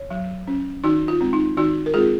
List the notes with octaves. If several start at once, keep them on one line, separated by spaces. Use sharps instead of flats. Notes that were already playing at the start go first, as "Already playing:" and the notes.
Already playing: C#5
F#3
C#4
D#3 D#4 F#4
F4
G#3 C4
D#4
D#3 D#4 F#4
A#4
G#3 C4 F4 G#4